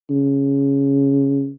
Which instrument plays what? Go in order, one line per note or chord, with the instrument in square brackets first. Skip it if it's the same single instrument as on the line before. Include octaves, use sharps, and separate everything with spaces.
[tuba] C#3